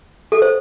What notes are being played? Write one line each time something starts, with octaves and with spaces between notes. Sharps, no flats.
A4
C5